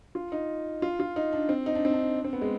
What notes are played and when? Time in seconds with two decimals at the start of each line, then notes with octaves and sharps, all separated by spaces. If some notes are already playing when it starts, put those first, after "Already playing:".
0.15 F4
0.32 D#4
0.82 F4
1.00 F4
1.16 D#4
1.33 D4
1.49 C4
1.66 D#4
1.75 D4
1.85 C4
1.94 D4
2.16 D4
2.24 C4
2.33 B3
2.41 G#3